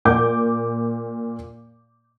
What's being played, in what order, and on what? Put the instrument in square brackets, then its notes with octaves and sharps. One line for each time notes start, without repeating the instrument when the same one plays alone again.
[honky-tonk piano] A#2 D6 G6